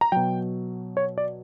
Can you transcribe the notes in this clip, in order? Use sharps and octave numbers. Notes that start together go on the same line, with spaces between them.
A#5
B2 F#3 G5
C#5
D5